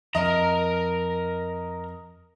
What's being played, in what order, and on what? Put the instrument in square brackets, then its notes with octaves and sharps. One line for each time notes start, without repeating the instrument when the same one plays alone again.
[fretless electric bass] F2 [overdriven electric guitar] A#4 A#5 [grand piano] D#5